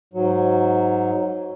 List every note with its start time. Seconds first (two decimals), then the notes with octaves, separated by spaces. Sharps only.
0.14 G#2 F#3